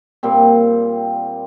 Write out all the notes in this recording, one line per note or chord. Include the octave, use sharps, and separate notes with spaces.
A#2 G3 C4